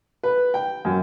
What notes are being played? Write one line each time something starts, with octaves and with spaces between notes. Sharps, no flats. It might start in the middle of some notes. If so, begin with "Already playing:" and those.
B4
G5
F#2